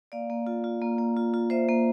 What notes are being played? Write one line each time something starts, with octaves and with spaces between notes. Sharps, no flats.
A#3 D5 F5
A#3
F4
F4
A#3
A#3
F4
F4
A#3 C5 E5
A#3